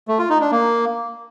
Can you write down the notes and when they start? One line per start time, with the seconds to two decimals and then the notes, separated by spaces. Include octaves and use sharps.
0.08 A3
0.19 F4
0.30 D#4
0.41 D4
0.51 A#3